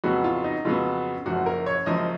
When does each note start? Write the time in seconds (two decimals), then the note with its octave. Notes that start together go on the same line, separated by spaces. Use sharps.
0.04 F2 C#3 F#3 B3 F#4
0.24 F4
0.44 D#4
0.65 F2 C#3 F#3 B3 F4
1.26 F#1 F#2 F3 F#4
1.46 A#4
1.66 C#5
1.86 F#1 F#2 F3 D#5